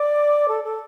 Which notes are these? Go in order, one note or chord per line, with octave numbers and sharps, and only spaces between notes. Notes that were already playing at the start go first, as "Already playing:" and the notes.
Already playing: D5
A4
A4